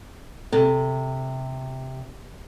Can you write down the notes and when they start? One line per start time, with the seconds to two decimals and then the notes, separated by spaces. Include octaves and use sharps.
0.53 C3 A4